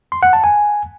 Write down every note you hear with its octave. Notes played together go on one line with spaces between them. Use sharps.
C6
F#5
A5
G#5